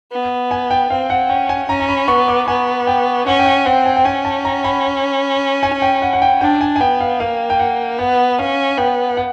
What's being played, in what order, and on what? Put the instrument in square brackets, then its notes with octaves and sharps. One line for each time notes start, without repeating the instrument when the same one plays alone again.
[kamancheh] B3
[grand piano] G#5
G5
[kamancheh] C4 [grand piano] F5
[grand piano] F#5
[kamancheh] C#4 [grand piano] G5
[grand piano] G#5
[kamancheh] C#4 [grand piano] A#5
[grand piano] A#5
B5
[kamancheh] B3 [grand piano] C#6
[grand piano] D6
[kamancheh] B3 [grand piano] G#5
[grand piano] G5
[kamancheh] C#4 [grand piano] F#5
[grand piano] G5
F#5
[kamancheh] C4 [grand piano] F#5
[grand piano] G#5
G5
[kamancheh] C#4 [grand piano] G#5
[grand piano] A5
A#5
B5
G#5
G5
F#5
F#5
G5
[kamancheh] D4 [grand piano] G5
[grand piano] G#5
G#5
[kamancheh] B3 [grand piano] G5
[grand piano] F5
[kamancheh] A#3 [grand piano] F5
[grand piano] G5
F#5
[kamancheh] B3 [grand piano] F#5
[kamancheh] C#4 [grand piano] F5
[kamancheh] B3 [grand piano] G5
[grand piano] F#5